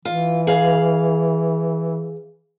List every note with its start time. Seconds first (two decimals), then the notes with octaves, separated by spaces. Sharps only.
0.05 E3 F4
0.47 G#4 F5